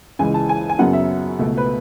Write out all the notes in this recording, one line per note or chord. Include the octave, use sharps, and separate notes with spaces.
C#2 C#3 E3 G#3 G#5
A5
G#5
G#5
F#2 C#3 F#3 B3 F#5
E5
C#2 B2 A3
B4